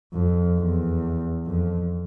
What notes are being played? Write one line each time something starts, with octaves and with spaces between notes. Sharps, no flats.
F2
E2
F2